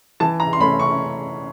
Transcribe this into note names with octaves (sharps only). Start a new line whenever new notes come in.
E3 A5
A#5
C6
A3 C#4 B5
C#6